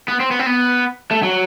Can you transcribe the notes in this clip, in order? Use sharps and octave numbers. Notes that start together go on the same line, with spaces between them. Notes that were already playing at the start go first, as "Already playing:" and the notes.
B3
C4
B3
C4
B3
A3
F#3